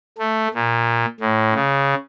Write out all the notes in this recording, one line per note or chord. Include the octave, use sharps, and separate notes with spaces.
A3
A#2
A2
C#3